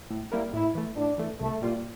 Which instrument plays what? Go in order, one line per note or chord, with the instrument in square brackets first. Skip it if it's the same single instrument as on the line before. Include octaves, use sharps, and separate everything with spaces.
[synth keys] A2
G3 A#3 E4 A#4
[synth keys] A2 [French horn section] E4
[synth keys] E3 A3
[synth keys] A2 [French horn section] D4
[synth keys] E3 A3
[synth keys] C2 [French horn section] A3
[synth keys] A#2 G3 A#3 F4